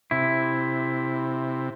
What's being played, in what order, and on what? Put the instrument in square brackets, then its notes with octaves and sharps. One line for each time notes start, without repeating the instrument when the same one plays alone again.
[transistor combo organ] C3 [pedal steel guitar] E4